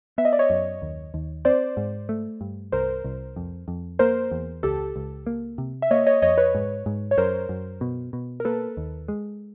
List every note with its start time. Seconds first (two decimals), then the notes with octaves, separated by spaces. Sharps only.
0.18 B3 E5
0.25 D#5
0.33 D5
0.39 C#5 D#5
0.50 F#2
0.82 D#2
1.14 D#2
1.45 C4 C5 D5
1.77 G#2
2.09 A3
2.41 G2
2.72 C2 A#4 C5
3.04 C2
3.36 F2
3.68 F2
3.99 A#3 A#4 C5
4.31 E2
4.63 C#2 G4 A4
4.96 C#2
5.27 A#3
5.58 C3
5.82 E5
5.91 A#3 C#5 D#5
6.06 C#5 D#5
6.22 F2 C#5 D#5
6.38 B4 C#5
6.55 G#2
6.86 G#2
7.11 C#5
7.17 F#2 A#4 C5
7.49 F#2
7.81 B2
8.13 B2
8.40 A#4
8.45 A#3 A4 B4
8.77 D#2
9.08 G#3